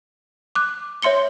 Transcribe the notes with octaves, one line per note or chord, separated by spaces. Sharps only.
D6 F#6
C#5 E5 C6 C#7 G7